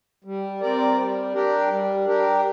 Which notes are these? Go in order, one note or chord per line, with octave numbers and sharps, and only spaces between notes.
G3
C4 A#4 D5
G3
D4 G4 A#4
G3
D4 G4 A#4